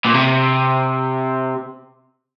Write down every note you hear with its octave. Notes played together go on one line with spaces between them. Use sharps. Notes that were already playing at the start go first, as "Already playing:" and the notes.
A#2
C3